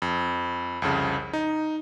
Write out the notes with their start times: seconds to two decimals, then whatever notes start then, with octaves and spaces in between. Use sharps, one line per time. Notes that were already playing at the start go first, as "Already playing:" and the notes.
0.02 F2
0.82 C2 F2 C#3
1.33 D#4